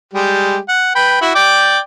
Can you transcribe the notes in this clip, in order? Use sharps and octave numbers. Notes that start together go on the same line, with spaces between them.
G3 G#3 G4
F#5
B4 G5 B5
E4 F#4
D5 G5 D6